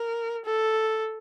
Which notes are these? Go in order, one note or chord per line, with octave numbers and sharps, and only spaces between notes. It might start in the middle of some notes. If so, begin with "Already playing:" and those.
Already playing: A#4
A4